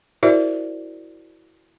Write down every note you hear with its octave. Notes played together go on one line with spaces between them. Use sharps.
E4 F#4 A#4 C5 D5 E5